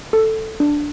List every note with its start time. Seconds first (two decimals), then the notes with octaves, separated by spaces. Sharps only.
0.13 A4
0.60 D4